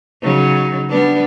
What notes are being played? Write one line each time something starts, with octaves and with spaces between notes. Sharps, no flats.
C#3 F#3 D#4
G3 B3 D4